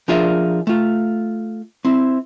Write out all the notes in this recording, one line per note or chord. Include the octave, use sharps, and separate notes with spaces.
F3 D4 F4 G#4 A#4 E5
A3 F4
C4 E4